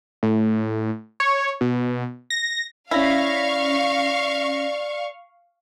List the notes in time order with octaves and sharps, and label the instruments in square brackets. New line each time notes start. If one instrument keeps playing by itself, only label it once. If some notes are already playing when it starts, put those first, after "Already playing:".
[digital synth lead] A2
C#5
B2
A#6
[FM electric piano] C#4 A#6 B6 [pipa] E4 [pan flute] D5 [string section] F5 C#6